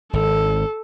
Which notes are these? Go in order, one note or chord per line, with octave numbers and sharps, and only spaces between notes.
G#1 A4